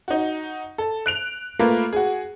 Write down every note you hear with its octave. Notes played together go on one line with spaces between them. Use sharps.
D#4 F#4
A4
F#6 D7 F7
A3 A#3 F4 A#4 B4
F#4 G#4